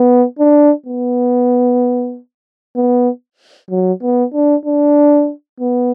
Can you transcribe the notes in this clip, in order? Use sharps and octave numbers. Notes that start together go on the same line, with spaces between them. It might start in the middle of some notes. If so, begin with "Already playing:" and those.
Already playing: B3
D4
B3
B3
F#3
B3
D4
D4
B3